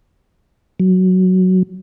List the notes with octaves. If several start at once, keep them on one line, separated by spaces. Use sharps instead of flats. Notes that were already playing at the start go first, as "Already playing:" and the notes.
F#3